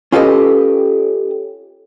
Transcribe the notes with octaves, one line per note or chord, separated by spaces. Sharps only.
C#4 F4 G4 A4 B4 D#5